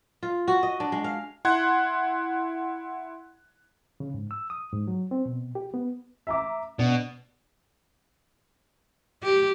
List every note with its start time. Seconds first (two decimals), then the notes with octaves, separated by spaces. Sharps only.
0.23 F4
0.48 F#4
0.63 D#5
0.80 D4
0.92 G#3
1.04 F5
1.45 E4 F#5 C6 F#6 G#6
4.00 C#3
4.14 G#2
4.31 E6
4.50 D#6
4.73 G#2
4.87 F#3
5.11 C4
5.26 B2
5.55 G4
5.74 B3
6.27 E5 A#5 D6
6.79 B2 D4
9.23 G4